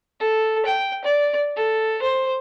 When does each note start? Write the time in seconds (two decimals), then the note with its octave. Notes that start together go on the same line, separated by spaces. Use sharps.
0.20 A4
0.66 G5
1.04 D5
1.56 A4
2.02 C5